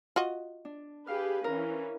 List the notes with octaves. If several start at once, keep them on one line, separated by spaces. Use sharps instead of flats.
F4 F#4 D#5
D4
G4 G#4 B4 F5 F6
E3 C#4 A#4